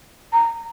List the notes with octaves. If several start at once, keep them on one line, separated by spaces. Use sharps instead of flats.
A#5